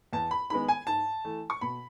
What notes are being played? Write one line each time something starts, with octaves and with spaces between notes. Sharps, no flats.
E2 A5
B5
D#3 G#3 B3 B5
G#5
G#2 A5
E3 A3
C#6
B2 B5